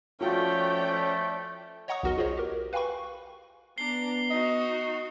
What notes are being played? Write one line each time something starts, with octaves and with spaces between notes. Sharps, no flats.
F3 A3 C#4 F4 F#4 D5 G5
C#5 D#5 F#5 A#5 C#6 D#6
B1 E2 F#4 A#4 D#5
F4 G#4 C5 C#5 D#5
G4 A#4
B4 F5 G5 G#5 B5 C#6
B3 D4 A#5 C7 G7
D#4 F#4 D#5